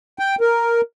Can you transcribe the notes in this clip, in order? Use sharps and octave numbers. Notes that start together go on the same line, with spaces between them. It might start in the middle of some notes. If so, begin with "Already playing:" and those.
G5
A#4